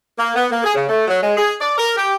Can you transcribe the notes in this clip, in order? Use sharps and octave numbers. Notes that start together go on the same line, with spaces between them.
A#3
B3
A#3
G#4
C#3
A3
F#3
G#3
G#4
D5
A#4
G4